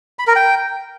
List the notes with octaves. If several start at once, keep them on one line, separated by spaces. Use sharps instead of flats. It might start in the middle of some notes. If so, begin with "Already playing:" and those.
B5
A#4
G5